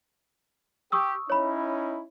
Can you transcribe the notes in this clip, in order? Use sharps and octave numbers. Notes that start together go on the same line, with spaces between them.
G4 C#6 D#6 E6
C#4 D#4 E4 C#5 B5